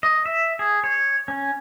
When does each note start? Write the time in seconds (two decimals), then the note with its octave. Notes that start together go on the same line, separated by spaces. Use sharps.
0.03 D#5
0.26 E5
0.59 G#4
0.84 C#5
1.28 C#4